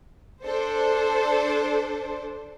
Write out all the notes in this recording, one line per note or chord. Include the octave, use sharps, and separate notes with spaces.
D4 A4 C5